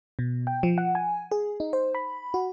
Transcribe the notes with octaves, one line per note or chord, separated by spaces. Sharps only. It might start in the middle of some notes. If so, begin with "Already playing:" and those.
B2
G5
F3
F#5
G#5
G#4
D#4
C5
B5
F#4